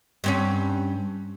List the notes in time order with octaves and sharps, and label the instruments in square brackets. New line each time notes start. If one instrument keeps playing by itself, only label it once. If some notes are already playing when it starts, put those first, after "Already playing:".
[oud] G2 C4 C#4